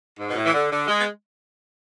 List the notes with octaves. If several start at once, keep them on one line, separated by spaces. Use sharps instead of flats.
G#2
B2
A2
E3
D3
D3
G#3
B3